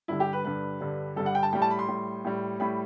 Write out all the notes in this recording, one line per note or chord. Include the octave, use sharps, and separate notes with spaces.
G2 D3 G3 E4
G4
B4
G2 D3 G3 B4
G2 D3 G3
G2 D3 G3 A4
F#5
G5
A5
A2 G3 G5
A5
B5
C6
A2 G3
A2 G3
A2 G3 B5